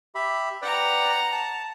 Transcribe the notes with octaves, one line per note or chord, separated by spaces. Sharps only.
G4 E5 B5
B4 D5 F#5 G5 A#5
A5